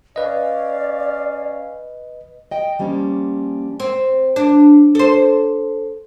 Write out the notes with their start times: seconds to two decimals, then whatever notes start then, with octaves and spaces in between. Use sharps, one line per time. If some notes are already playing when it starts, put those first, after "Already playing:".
0.16 C#4 B4 D5 D#5 F5
2.51 D#5 G5
2.79 F3 G3 A#3 C#4
3.80 C4
4.36 D4
4.95 A4 C5